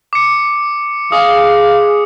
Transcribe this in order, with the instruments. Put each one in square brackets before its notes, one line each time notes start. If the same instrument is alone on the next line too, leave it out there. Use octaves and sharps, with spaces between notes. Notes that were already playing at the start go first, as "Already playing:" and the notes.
[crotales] D6 C#7
[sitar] G#3 [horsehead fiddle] F5 [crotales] D#6